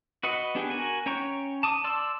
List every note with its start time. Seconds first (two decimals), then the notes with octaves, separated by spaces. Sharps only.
0.23 F#4 B4 D#5 F#5
0.55 B3 D4 G4 G#4
0.70 F#4 A#4 G#5
1.06 C#4 C#5 G5 A#5 C#6
1.63 A5 D6 D#6
1.84 D5 A5 C6 D6 E6